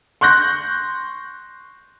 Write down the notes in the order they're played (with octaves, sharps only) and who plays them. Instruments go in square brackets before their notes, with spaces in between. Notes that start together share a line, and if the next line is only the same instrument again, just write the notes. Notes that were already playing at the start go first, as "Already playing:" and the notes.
[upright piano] C6 C#6 F#6 G6 A#6